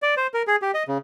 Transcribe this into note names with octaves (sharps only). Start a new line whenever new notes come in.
D5
C5
A#4
G#4
G4
D#5
C#3